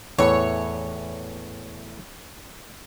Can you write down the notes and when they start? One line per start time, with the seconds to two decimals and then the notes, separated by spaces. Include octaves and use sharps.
0.18 E2 A2 E3 C#5